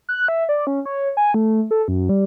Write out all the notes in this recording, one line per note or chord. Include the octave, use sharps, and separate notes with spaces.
F#6
E5
D5
C#4
C#5
G#5
A3
A4
F#2
G3